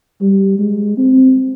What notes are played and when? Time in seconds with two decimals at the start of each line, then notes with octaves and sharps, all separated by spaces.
0.21 G3
0.59 G#3
0.98 C4